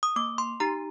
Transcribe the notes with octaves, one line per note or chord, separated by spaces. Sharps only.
D#6
A#3 D6
C6
D#4 G4 A#5